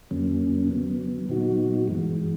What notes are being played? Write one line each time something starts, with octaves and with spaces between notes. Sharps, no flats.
F2 D3 F#3 A#3 C#4
D3 F#3 B3
A#2 F#3 B3 D#4 F#4
G2 E3 G#3